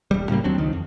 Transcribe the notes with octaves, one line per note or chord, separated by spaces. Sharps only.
E1 G3
A2 C#3 G3 A#3
D#2 F#3 C4 D4
C#2 D#3
F2